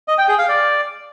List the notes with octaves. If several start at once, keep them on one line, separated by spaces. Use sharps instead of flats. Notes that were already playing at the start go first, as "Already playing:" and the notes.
D#5
G5
G#4
F5
D5